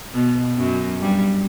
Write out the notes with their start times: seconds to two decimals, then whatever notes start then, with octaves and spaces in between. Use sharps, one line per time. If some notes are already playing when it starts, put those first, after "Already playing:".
0.13 B2 B3
0.57 F#2 F#3
1.01 G2 G3